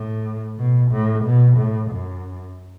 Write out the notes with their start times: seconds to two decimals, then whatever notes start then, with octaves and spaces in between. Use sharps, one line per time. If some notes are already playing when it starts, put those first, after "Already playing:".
Already playing: A2
0.58 B2
0.92 A2
1.25 B2
1.57 A2
1.91 F#2